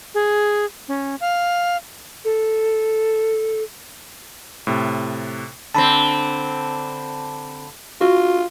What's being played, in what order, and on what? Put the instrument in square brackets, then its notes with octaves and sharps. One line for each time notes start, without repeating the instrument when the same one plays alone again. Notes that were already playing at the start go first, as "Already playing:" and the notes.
[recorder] G#4
C#4
F5
A4
[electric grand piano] A2 C3
[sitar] D3 C4 [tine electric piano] A5 B5
[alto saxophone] F4 [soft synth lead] F#4